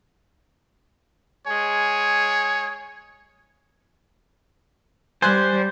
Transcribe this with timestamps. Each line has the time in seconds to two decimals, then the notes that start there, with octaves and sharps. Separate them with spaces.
1.47 G#3 C#5 G#5
5.22 G3 C5 G#5 C6 F#6